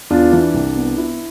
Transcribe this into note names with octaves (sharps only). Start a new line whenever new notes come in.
E2 D4 F4
E3 D4
C2
B3
B3 E4